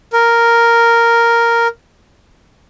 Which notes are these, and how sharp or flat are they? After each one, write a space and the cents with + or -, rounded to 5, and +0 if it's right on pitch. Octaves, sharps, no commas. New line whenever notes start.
A#4 +0